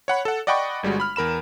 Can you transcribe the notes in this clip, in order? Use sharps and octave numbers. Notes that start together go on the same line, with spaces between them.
C#5 F#5 B5
A4 F#5
D5 D#5 F#5 G5 B5 C#6
G1 G3 G#3 F#4
B5 F6
E2 A#4 B5 E7